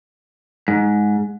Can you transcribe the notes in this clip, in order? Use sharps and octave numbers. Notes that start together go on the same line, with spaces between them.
G#2